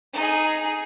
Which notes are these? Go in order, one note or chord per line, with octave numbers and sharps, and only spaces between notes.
D#4 G#4